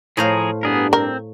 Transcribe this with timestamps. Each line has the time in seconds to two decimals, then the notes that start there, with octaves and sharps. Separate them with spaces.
0.17 A2 F3 G#4 C5 F5 A#5
0.63 G2 G3 B3 D4 G#4 A#4
0.93 C4 A#4